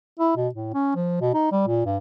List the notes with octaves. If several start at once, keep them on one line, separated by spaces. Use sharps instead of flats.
E4
B2
A2
C#4
F3
B2
D#4
G3
A#2
G2